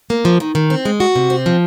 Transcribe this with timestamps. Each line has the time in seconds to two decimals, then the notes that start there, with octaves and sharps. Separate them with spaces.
0.10 A#3
0.25 F3
0.40 D#3
0.55 D#3
0.70 C4
0.85 G#3
1.00 F#4
1.16 C3
1.30 C4
1.46 F3